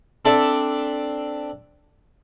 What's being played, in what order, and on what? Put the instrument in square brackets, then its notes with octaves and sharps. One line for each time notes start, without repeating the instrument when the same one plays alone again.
[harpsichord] C4 D4 A4 D5 E5